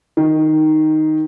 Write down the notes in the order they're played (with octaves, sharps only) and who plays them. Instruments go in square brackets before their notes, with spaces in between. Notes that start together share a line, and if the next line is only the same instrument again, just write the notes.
[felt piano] D#3